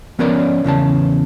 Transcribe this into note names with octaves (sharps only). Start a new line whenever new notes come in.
F3 B3 C#4 A#4 C#5 D5
E2 C#3 C#4 A5